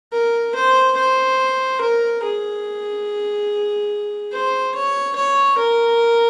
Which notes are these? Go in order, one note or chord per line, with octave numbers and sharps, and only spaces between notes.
A#4
C5
C5
A#4
G#4
C5
C#5
C#5
A#4